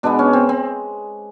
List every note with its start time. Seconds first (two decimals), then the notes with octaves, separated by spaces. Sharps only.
0.03 B2 G#3 B3 D4
0.19 C#4
0.33 C4
0.49 C4